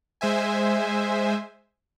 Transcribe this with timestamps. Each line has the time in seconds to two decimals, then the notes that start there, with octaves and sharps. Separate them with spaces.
0.21 G#3 C5 E5 G#5